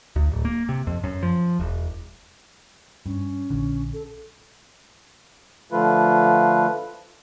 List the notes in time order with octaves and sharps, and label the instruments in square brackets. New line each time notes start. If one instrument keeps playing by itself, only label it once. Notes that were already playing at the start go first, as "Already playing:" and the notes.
[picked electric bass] D2
D1
A#3
C3
F2
F#2
F3
E1
[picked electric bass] G2 [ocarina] C#4
[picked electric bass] A#1 D3
[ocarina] A4
[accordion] D3 F3 A3 F4 B4